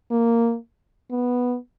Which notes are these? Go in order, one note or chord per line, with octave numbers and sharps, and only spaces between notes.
A#3
B3